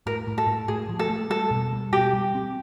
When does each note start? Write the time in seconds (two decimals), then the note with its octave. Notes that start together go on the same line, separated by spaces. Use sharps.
0.06 A2 A#4
0.27 A2
0.38 A4
0.47 A2
0.68 A2 G#4
0.89 F3
0.99 A4
1.09 A3
1.30 G3 A4
1.51 B2
1.73 G3
1.92 B2 G4
2.13 G3
2.35 C4